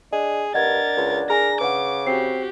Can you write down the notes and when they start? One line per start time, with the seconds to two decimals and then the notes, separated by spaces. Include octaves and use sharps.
0.12 D4 G#4 D#5
0.54 G2 D4 A#4 D#5 F#5 G#6 A6
0.97 C#2
1.30 G#4 A#4 G#5 A#5 A#6
1.61 C#3 B4 F#5 D6
2.07 C4 F#4 G4 C7